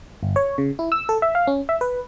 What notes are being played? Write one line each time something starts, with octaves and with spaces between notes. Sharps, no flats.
G1
C#5
C#3
E4
E6
A4
E5
F5
C#4
E5
B4